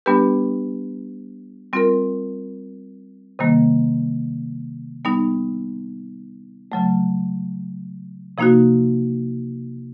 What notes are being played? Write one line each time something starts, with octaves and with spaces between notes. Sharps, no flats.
G3 B3 D4 G4 B4
G3 C4 F4 A#4
C3 D#3 G3 A#3
G3 B3 D#4
C#3 F#3 A3
C3 F3 A#3 D#4 F#4